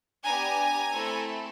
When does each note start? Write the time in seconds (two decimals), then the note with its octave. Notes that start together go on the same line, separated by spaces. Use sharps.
0.25 B3 D4 G4 G#5 A#5
0.93 A3 C4 E4 A4